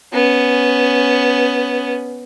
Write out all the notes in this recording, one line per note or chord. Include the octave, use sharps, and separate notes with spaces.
B3 C#4